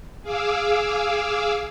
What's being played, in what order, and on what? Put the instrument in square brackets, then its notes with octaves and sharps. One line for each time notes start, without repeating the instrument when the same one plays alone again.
[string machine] G#4 F5 D6 E6